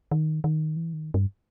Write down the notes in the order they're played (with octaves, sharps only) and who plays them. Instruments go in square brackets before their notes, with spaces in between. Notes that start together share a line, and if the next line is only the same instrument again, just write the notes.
[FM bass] D#3
D#3
E3
D#3
G2